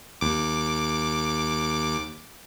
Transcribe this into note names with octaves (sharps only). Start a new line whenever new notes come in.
D#2 D6